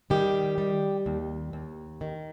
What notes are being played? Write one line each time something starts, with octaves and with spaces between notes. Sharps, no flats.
D#3 G3 G4
G3
D#2
D#2
D#3